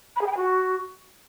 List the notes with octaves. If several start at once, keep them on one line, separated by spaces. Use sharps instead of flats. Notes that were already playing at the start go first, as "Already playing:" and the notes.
B5
G#4
G5
G#5
F#4